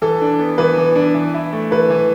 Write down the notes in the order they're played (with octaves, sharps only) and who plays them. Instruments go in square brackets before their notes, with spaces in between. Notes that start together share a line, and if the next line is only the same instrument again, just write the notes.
[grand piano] E3 [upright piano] A4
[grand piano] D4
B3
[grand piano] E3 [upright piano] B4
[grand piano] E3
D4
E3
E4
A3
[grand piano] E3 [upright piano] B4
[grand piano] E3